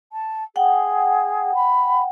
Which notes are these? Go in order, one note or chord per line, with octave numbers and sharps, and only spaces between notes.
A5
G#4 F#5 G5
B5